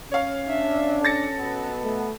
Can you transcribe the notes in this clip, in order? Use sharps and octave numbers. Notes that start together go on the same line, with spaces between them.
C#4 C#5 F5
D4 E5
A4 A6 A#6 C#7
B2 B3
A3